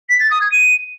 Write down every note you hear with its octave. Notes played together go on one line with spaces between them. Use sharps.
B6
A6
D#6
G#6
D#7